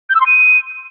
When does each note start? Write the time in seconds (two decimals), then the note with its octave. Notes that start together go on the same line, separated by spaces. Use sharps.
0.09 G6
0.15 E6
0.20 C6
0.26 D#7